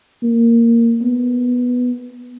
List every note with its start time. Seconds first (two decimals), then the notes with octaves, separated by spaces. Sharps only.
0.22 A#3
1.02 B3